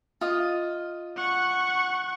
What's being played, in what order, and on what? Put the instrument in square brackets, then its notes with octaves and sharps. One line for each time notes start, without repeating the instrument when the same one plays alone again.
[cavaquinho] F4 D#5
[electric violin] F#5 C#6